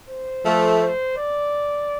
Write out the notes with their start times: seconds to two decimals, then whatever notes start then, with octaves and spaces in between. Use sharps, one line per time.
0.09 C5
0.46 F3 A3
0.81 C5
1.17 D5